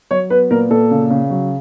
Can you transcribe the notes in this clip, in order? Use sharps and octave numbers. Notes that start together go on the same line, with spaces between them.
F#3 C#5
B3 B4
A#2 A#4
A#2 A4
C#3
C#3
F#3